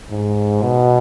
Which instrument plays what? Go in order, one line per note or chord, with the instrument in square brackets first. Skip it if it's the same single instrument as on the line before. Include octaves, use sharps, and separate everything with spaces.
[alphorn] G#2
B2